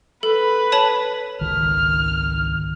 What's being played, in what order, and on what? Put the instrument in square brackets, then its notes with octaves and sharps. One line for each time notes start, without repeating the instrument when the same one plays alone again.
[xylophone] A4 [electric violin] B4 B5
[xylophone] C#5 A5 F#7
[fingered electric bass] G#1 C#2 D#3 [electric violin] F6